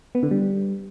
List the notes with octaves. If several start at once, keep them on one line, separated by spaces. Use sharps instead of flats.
B3
D3
G3